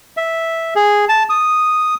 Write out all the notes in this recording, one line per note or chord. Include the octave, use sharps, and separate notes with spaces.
E5
G#4
A5
D#6